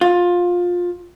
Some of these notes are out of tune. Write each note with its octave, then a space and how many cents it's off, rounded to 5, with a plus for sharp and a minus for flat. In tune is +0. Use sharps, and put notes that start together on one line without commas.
F4 +20